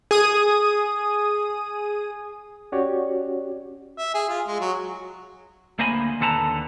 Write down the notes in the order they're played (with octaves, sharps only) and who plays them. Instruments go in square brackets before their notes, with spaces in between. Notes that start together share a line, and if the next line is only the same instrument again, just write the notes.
[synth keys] G#4 D#6
[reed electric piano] C#4 F#4 G4 C#5 D5
[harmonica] E5
G#4
F4
G#3
F#3
[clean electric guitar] D2 A#3 C5 D#5 G#5 B5
D#2 D3 A4 B4 A5 A#5